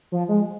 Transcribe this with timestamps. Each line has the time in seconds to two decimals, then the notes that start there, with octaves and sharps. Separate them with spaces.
0.12 F3
0.29 G#3